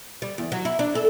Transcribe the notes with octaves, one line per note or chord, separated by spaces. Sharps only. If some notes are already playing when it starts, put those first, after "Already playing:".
G3
E2
F#3
E4
D4
A4